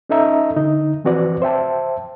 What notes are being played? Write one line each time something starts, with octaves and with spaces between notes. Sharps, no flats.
C#4 D#4 A4 D#5 E5 A#5
D3 D#4
E3 F3 C4 F#4 B4 D5
C5 E5 G5 A5